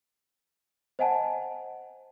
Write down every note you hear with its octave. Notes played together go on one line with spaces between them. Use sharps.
C5 D#5 F#5 G#5 A5